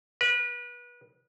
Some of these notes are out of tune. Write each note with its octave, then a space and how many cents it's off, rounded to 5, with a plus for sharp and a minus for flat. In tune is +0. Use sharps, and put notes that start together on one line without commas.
B4 -30